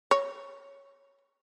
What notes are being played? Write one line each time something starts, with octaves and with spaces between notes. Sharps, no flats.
C#5